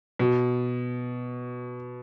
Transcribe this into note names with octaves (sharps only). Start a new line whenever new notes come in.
B2